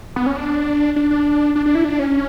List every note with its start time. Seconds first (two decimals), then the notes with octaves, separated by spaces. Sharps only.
0.16 B3
0.26 C#4
0.37 D4
0.96 D4
1.11 D4
1.56 D4
1.66 D4
1.75 E4
1.84 D4
1.99 C#4